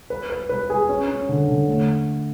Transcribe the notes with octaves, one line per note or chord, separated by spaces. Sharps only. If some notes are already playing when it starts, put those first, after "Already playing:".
B4
B4
B4
G#4
C#4
C#4
D3
D3
A3